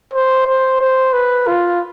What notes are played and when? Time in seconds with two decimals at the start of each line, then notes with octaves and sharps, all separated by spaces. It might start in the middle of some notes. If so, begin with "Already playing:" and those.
0.14 C5
0.47 C5
0.81 C5
1.13 B4
1.47 F4